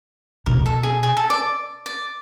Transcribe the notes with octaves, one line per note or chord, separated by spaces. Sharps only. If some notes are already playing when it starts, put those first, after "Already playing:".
B2 A#4
A4
G#4
G#4
A4
D5
D5